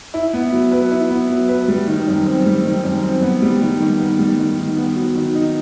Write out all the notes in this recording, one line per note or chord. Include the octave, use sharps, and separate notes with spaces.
E4
B3
F#3
B4
E4
B3
F#3
B4
G3
D#3
F#2
C4
G3
D#3
F#2
C4
B3
G3
D#3
D#3
B3
G3
D#3
D#3
B3
F#3
D#3
D#4